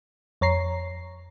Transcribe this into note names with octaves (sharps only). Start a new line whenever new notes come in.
F2 C#5 A#5 C7